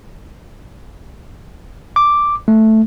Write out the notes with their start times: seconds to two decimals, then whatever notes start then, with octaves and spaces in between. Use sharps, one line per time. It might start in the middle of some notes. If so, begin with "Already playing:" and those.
1.96 D6
2.48 A3